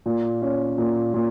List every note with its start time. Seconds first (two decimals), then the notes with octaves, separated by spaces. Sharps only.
0.06 A#2
0.42 C#4
0.78 A#2
1.14 A#2